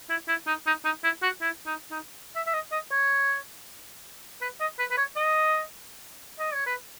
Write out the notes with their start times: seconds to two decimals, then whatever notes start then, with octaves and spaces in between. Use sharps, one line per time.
0.10 E4
0.28 E4
0.47 D#4
0.67 D#4
0.85 D#4
1.04 E4
1.23 F#4
1.41 E4
1.66 D#4
1.91 D#4
2.36 E5
2.47 E5
2.54 D#5
2.72 D#5
2.92 C#5
4.42 B4
4.60 D#5
4.79 B4
4.91 B4
4.98 C#5
5.16 D#5
6.39 D#5
6.54 C#5
6.67 B4